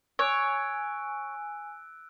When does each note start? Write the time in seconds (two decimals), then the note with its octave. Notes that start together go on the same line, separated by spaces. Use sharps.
0.19 C#5 G#5 E6 F#6 D7